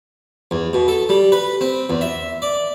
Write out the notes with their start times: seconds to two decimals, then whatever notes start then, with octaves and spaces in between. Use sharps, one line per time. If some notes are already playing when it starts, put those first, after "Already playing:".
0.51 E2
0.73 B2
0.88 A4
1.09 G3
1.32 B4
1.61 C4
1.90 E2
2.01 E5
2.42 D5